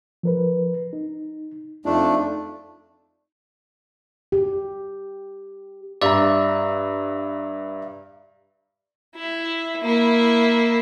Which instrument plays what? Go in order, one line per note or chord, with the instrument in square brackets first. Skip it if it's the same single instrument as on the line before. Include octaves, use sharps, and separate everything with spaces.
[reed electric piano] F3 A#4 B4
D#4
[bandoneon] F2 A3 D4 [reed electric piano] D#4 F4
[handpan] G4
[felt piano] G2 A#5 [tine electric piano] D5 E5
[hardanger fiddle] E4
A#3 E4